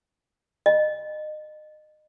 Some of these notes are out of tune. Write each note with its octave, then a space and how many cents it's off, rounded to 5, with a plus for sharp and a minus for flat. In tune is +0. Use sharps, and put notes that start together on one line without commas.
D#5 -30